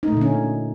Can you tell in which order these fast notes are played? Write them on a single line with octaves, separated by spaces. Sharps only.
D#4 A3 A#2 D3 C#4